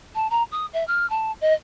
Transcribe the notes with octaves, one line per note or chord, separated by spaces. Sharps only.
A5
A#5
D#6
E5
F6
A5
D#5